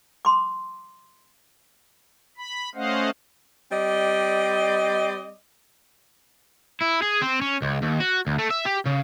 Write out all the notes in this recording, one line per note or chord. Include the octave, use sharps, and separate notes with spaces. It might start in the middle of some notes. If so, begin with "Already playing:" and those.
C6 D6
B5
A3 C#4 C5 D#5 F5 F#5
G3 C4 D5 D#5
E4
G#4
C4
C#4
C#2
D#2
F#4
D2
A3
E5
G4
C#3